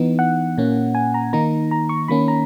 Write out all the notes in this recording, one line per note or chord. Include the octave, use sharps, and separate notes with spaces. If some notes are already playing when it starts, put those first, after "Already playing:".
Already playing: E3 B3 D#4
F#5
A#2 A#3 C#4
G#5
A#5
D#3 A#3 D#4 A#5
A#5
C#6
D#3 A#3 C#4 B5
A#5